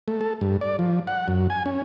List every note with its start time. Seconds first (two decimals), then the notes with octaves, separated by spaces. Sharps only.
0.08 A3
0.21 A4
0.41 G2
0.61 D5
0.79 F3
1.07 F#5
1.28 F#2
1.50 G#5
1.66 C#4